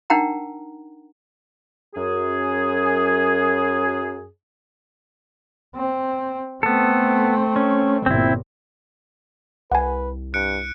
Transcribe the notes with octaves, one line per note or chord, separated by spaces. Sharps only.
D4 D#4 A#4 F#5 G5 A#5
F#2 G#4
C4
A3 B3 C4 A4
C#4
G1 A#2 C4 E4
C2 B4 F#5 G#5
G2 F#6 C#7 D7